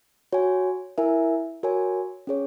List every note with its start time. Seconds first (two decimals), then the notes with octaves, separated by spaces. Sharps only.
0.32 F#4 C#5 G#5
0.98 E4 A#4 E5 G#5
1.63 F#4 A#4 C#5 G#5
2.27 C#4 G#4 C#5